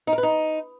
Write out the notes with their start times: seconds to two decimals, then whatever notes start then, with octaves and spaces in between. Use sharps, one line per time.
0.07 D#4
0.13 A#4
0.18 B4
0.23 D#4